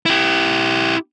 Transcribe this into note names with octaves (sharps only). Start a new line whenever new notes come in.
E4 G4